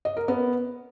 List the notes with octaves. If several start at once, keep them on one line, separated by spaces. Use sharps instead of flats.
D#5
A#4
B3